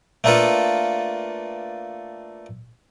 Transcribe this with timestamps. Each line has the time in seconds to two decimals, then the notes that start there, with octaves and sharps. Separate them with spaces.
0.24 A3 A#3 D4 F4 A4 B4